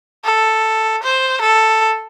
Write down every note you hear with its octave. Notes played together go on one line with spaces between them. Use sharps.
A4
C5
A4